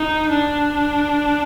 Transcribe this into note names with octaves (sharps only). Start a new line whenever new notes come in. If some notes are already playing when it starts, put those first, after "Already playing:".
Already playing: D#4
D4